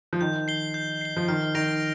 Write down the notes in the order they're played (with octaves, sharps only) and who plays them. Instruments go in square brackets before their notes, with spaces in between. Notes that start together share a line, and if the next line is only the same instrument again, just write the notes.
[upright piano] F3
[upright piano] D#3 [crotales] G6
[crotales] C7 G7
G6
C7 G7
[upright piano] F3
[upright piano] D#3 [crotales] F6
[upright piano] D#3 [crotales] A#6 D7 F7